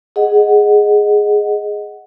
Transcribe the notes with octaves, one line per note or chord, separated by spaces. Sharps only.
G#4 D#5 F#5